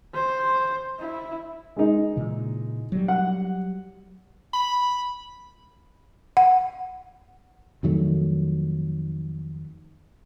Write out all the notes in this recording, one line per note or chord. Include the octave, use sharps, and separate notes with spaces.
C5
E4
G#3 D#4
A#2 C#3 E3
F#3 G3
F#5
B5
F#5
F2 D#3 F#3 A3